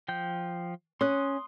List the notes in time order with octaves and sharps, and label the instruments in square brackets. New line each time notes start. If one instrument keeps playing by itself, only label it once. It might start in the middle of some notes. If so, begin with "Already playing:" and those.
[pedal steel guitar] F3 G5 G6
[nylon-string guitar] C#4 [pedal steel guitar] C6 D#6 F#6